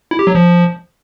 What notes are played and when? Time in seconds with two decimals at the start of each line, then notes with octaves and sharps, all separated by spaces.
0.11 E4
0.19 G4
0.27 F#3
0.35 F3